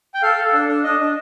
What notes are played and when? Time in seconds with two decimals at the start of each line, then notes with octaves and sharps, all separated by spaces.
0.14 G5
0.22 A4 F5
0.37 A4
0.53 D4
0.69 D4
0.83 D4 D#5
0.99 D4